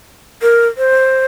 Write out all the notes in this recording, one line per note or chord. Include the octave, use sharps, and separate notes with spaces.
A#4
C5